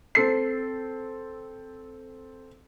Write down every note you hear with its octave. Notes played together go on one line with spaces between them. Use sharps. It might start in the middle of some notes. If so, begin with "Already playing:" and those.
C4 A4 C7